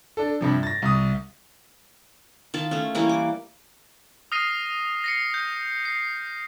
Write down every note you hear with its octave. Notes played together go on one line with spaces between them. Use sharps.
D4 A4
G2 C3 F3
A6 A#6
C2 D#6
D#3 F4 A5
A3 C#4
E3 G3 A#3 C#4
D6
D#6 F6 A#6 C7 D#7
A#6 C7 C#7
G6
C7